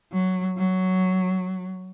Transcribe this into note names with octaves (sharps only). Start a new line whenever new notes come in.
F#3
F#3